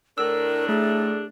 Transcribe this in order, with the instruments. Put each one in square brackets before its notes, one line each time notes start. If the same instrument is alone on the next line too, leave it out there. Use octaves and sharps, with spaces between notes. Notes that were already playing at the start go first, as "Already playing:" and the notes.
[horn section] A2 D4 [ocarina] A#4 [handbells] E6
[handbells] A3 [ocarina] G#4